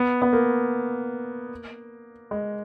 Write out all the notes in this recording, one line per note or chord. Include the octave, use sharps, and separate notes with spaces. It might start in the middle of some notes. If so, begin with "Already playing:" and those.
Already playing: B3
B3
A#3
G#3